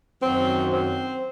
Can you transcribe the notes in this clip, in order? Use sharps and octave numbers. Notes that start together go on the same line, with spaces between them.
F#2 D#3 F#3 C4
C4